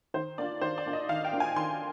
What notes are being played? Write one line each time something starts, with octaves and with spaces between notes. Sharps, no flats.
D#3 C5
A#3 D4 F4 D5
D#3 C5
D5
A#3 D4 F4
D#5
D#3 F5
G5
A#3 D4 F4
G#5
D#3 C6